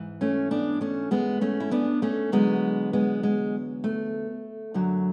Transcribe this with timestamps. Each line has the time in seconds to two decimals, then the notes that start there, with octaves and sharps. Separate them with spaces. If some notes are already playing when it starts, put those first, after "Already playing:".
Already playing: G#2 E3
0.21 A3 C#4
0.51 B3 D4
0.81 A3 C#4
1.11 G#3 B3
1.41 A3 C#4
1.60 E4
1.71 B3 D4
2.02 A3 C#4
2.32 E2 D3 F#3 G#3 B3
2.93 G#3 B3
3.23 G#3
3.84 A3
4.74 F#2 D3 F#3